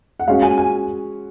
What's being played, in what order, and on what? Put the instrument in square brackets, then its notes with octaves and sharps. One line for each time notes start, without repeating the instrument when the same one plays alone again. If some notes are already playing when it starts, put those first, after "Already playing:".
[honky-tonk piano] F#5
[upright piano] G#3 C#4 F#4 [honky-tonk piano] F5
[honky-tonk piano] G#5
G#5